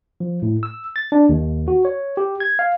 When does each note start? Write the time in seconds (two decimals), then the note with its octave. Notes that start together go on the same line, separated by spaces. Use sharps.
0.20 F3
0.42 A2
0.63 E6
0.96 A6
1.12 D4
1.29 D#2
1.68 F#4
1.85 C#5
2.17 G4
2.40 G#6
2.59 F5